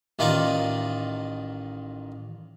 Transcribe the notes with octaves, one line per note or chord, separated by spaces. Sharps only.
A1 D#3 D#4 F4 D5